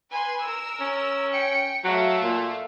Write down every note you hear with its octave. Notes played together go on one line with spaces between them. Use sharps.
B4 G#5 C6
A#4 E6
C#4
G5 C#7
F#3 A3 E5 F5
A#2